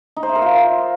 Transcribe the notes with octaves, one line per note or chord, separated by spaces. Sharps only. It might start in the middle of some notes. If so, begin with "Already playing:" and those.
D#4
C5
E5
A#4
F4